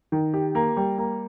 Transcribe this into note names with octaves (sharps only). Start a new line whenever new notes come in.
D#3
G4
A#3
G3
A#3